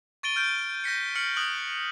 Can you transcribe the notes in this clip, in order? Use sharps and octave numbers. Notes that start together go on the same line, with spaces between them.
C#6 A6 D7 D#7 G7
F6 G6 D7
G6 A#6 B6 C#7
F6 C#7 F#7
D#6 F#6 F#7